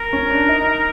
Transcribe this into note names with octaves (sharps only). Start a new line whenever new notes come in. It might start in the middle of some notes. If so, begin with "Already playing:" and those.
Already playing: A#4
C#4
D4
D#4